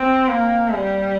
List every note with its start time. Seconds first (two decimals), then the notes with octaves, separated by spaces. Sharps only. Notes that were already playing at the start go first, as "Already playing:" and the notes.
Already playing: C4
0.29 A#3
0.74 G3